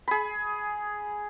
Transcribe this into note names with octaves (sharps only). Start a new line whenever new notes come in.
G#4 B5